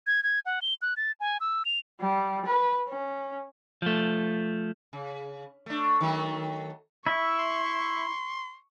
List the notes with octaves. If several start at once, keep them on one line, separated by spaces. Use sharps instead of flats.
G#6
G#6
F#5
G7
F#6
A6
G#5
E6
F7
G3
B4
C#4
F3 A3
C#3
A3 D4
D#3 F#3 A3
E4 E5 C#6
C6